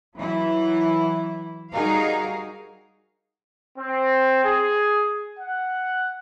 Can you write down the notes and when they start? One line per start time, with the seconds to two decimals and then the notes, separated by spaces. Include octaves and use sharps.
0.18 E3 F#3 E4
1.73 G3 D#4 F#4 G#4 A#4 F5
3.77 C4
4.44 G#4
5.38 F#5